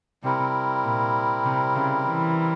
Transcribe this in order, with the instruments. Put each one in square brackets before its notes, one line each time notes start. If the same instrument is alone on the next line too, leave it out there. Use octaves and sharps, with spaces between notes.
[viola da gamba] C3 [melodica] G3 C4 E4 A#4
[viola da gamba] A#2
C3
C#3
E3